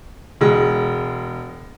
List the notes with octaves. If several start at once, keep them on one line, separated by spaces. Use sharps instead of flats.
E1 G#3